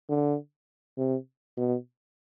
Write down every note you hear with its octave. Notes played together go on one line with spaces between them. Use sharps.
D3
C3
B2